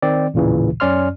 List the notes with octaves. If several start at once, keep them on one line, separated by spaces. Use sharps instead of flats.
D#3 C4 D5
A1 D#2 A#2 C#3 E3
F#2 C#4 D5 C6 F6